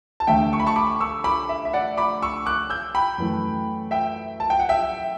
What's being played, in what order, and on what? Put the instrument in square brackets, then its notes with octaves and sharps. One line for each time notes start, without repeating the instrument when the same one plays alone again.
[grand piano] A5
D2 D3 A3 E5 G5
C#6
B5
A5 C#6
B5 D6
C#6 E6
B5 D6
E5
E5
D5 F#5
B5 D6
C#6 E6
D6 F#6
E6 G6
G5 B5
F#2 E3 A3
E5 G5
A5
G5
F#5
E5 G5